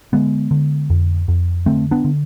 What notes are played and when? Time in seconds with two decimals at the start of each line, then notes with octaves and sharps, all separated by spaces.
0.13 D3 G#3 B3
0.51 D3
0.90 F2
1.28 F2
1.66 D3 A3 C4
1.91 B3 D4
2.05 D3